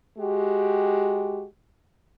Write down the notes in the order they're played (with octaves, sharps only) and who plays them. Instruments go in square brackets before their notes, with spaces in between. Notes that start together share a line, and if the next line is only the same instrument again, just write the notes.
[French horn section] G#3 F#4 G4